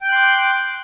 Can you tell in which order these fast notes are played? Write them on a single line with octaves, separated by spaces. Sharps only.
G5 G6 F#6 C6 D6